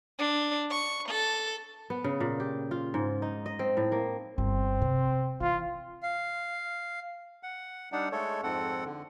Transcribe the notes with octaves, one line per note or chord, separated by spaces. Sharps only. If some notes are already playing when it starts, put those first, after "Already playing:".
D4
C#6
A4
B3
C#3
A#2
G4
F4
G#2
D#4
D#5
C4
A2
A#3
G1 C4
C3
E3 F4
F5
F#5
G3 D4 D#4 F#5
G#3 A3 A4 C#5
F2 G#2 C4 A4 F#5
D3